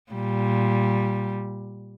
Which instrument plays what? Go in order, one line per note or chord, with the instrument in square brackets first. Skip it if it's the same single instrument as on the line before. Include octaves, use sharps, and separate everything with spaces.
[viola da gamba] A#2 G3